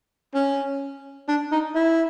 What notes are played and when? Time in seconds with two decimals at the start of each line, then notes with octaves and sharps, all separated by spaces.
0.35 C#4
1.29 D4
1.52 D#4
1.75 E4